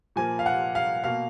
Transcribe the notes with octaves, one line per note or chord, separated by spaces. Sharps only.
A#2 F3 A#3 G#5
F5
F#5
F5
B2 A#3 F5